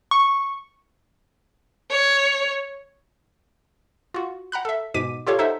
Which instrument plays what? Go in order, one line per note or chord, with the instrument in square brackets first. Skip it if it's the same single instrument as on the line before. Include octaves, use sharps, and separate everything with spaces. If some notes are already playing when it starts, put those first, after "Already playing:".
[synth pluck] C#6
[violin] C#5
[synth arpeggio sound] F4 F#4
F#5 A#5 B5 F#6
A4 E5
G#2 B2 D6 B6 D#7
F4 G4 A4 C#5 F5
D#4 A4 C5 E5 F#5